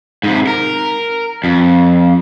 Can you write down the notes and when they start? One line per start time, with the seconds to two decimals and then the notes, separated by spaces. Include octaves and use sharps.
0.24 G#2 C3
0.47 A#4
1.44 F2